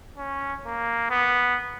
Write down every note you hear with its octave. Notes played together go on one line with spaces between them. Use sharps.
C#4
A#3
B3